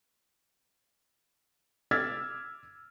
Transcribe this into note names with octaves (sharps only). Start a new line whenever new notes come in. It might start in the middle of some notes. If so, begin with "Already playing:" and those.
D6 E6 F6 G#6 A6 B6